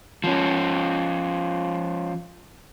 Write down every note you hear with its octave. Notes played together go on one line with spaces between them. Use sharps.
F3 C#4